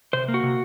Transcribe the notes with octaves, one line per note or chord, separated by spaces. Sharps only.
C3 C5
A#3
F#4
C3